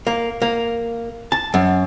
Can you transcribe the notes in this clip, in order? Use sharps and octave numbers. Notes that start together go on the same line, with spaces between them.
A#3
A#3
A5
F#2